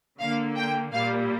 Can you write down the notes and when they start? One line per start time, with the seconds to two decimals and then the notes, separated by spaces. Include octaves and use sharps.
0.19 D3 A#3 F5
0.57 G5
0.93 A#2 G3 A#3 F5